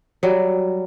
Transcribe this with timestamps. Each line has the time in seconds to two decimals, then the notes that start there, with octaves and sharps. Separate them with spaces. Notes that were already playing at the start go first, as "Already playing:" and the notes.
0.23 F#3 G3